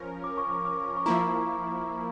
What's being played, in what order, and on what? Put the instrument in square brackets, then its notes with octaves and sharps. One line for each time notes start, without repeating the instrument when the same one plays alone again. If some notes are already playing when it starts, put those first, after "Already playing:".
Already playing: [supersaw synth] F3 C#4 A#4
[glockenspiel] D6
C#6
D6
D6
C#6
[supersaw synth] F3 A#3 E4 [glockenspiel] A#5